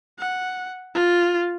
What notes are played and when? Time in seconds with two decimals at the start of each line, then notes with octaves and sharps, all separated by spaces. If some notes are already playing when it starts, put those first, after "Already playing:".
0.19 F#5
0.95 F4